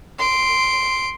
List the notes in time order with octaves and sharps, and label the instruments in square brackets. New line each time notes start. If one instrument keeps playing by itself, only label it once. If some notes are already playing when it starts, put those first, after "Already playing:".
[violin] C6 D7